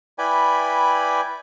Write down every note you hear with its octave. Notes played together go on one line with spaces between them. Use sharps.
E4 B4 D5 G5 G#5 B5